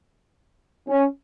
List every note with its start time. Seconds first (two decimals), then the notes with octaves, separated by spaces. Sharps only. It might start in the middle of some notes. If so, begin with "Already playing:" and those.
0.88 C#4